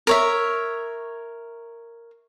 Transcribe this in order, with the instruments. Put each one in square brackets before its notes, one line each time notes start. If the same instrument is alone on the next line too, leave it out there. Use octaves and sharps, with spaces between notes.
[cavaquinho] A#4 C#5 E5